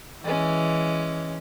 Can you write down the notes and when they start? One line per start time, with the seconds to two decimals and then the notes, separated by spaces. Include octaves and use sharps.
0.24 E3 G#3 C#4